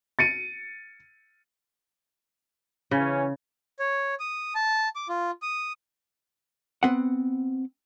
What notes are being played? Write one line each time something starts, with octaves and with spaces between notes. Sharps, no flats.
A6 C#7 D#7
C#3 E3 C#4
C#5
D#6
A5
D6
F4
D#6
B3 C4 F#5